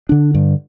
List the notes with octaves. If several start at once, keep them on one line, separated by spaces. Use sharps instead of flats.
D3 D4
G2